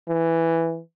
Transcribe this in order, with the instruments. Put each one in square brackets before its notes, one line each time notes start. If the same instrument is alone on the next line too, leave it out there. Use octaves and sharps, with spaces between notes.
[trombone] E3